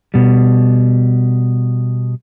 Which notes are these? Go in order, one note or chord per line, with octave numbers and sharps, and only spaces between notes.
B2 G3